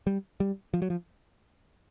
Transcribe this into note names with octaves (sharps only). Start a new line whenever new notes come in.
G3
G3
F3
F#3
F3